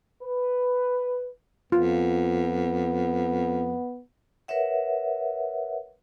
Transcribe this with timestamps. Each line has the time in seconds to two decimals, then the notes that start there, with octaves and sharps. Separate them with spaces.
0.23 B4
1.72 F2 B3 F4
4.48 A#4 B4 C#5 E5 F#5